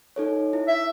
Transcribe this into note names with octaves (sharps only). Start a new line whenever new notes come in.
D#4 A4 C#5
E4
E5